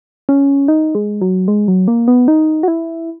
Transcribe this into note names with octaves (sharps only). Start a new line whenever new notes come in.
C#4
D#4
G#3
F#3
G#3
F#3
A#3
B3
D#4
F#4
E4